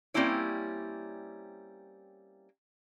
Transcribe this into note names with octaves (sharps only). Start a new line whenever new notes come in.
G3 A#3 C4 C#4 E4 C#5